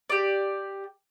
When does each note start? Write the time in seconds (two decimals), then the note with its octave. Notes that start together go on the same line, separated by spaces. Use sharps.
0.10 G4 D5